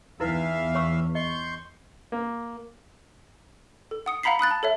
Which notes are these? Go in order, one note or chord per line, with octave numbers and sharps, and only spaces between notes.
E2 E3 D#4 E4 B4 E5 F5
C#5 C#6 E6
D#5 C6 C#6 G6
A#3
A4
F#5 D#6 C#7
F5 F#5 A#5 B5 B6 C7
B5 D#6 F#6 A6
A5
A4 C#5 E5